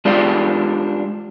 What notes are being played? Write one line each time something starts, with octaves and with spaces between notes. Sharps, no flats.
G#3 D4 F4 G4 D5 F5